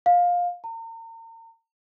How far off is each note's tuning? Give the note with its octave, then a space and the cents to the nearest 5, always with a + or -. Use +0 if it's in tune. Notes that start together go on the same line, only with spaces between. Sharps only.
F5 +15
A#5 -40